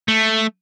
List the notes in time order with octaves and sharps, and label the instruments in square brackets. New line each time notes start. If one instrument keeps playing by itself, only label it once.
[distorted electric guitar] A3